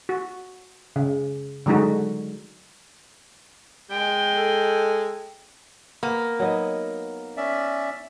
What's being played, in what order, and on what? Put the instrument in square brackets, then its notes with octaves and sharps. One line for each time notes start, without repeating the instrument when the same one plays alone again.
[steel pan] F#4
C#3
D3 F#3 G#3 D#4 F#4
[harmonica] G#3 [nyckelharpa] G5
[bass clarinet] A4
[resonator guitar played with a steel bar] A#3 [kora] B3
[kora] F#3 B3 D#4
[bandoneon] C#4 D5 E5